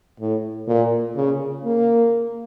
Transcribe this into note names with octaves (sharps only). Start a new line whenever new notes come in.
A2
A#2
C#3
A#3